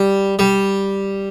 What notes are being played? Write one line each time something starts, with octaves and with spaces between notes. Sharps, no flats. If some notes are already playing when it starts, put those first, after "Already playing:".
Already playing: G3
G3